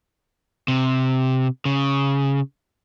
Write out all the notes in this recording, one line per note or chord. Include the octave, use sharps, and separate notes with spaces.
C3
C#3